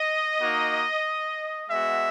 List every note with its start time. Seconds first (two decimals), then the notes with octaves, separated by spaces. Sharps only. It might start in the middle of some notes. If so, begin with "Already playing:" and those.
Already playing: D#5
0.41 A#3 D#4 F#4
1.70 G#3 B3 F#4 E5